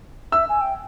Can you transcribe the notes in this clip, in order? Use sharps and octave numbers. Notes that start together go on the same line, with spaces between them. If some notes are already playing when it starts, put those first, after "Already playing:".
E5 E6
G#5
G5